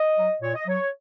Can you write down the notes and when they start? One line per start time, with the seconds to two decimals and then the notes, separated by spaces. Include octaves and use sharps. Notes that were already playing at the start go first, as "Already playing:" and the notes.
Already playing: D#5
0.17 F#3
0.42 A#2 C#5
0.55 D#5
0.66 F#3 C#5